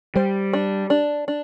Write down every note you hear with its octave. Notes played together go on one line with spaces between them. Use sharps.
G3 C5
D4
D4
D4